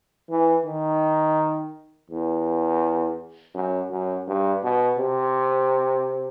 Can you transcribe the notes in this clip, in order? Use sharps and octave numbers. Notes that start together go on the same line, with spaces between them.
E3
D#3
E2
F#2
F#2
G2
B2
C3